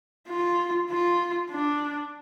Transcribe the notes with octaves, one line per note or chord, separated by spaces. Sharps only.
F4
F4
D4